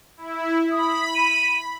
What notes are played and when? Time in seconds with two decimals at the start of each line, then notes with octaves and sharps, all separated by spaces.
0.17 E4
0.72 B5 D#6
1.15 D#7